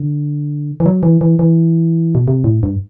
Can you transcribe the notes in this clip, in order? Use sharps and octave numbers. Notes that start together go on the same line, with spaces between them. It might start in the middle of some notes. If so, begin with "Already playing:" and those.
Already playing: D3
E3
F#3
E3
E3
E3
B2
C3
A2
G2